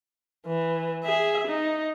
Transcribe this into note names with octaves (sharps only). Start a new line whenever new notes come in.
E3
G#4 E5
D#4